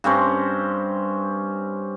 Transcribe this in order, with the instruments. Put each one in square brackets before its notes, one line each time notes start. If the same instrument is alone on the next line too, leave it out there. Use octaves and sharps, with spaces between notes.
[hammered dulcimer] G2 C4 C#4 C5